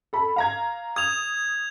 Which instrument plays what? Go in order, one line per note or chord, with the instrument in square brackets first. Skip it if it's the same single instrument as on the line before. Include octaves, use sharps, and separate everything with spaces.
[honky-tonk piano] A4 B5
F5 A#5 G#6
[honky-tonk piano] D#6 [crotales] G#6 F7